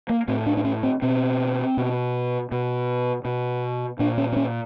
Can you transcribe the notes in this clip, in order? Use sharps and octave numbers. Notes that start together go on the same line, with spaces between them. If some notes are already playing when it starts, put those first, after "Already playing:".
A#3
A2 C4
D4
D4
C#4
C4
B2 C4
B2
B2
B2
A#2 D4
C#4
C4
C#4